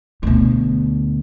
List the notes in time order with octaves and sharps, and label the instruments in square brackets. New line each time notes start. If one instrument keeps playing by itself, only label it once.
[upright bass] D2 B2